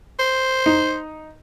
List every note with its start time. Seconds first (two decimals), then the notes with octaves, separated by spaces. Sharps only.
0.19 C5
0.66 D#4